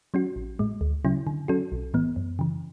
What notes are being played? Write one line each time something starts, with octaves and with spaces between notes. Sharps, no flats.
F#3 C#4 F#4
A1
A2 G#3
D2
C#3 F#3 C#4 E4
D3
F#3 C#4 F#4 A4
B1
A2 E3 B3
F#2
C#3 E3